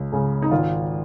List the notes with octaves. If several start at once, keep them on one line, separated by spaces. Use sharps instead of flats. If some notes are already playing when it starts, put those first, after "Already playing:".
Already playing: C#2
C#3 G#3
D#4
G#1 F4